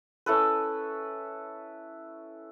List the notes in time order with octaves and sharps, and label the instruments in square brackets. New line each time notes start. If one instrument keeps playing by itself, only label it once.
[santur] C#4 E4 A4 B4